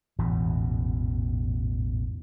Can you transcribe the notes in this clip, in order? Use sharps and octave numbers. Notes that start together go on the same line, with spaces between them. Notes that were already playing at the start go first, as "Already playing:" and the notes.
A1 E2 G#2 B2